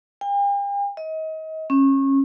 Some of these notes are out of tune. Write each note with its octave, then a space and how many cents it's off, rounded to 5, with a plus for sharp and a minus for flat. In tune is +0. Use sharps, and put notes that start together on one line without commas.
G5 +45
D#5 +30
C#4 -25